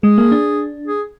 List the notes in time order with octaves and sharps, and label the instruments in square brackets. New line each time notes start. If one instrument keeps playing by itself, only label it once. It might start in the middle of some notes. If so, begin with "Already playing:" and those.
[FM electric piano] G#3 [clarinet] G#4
[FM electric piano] A#3
D4
[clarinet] G#4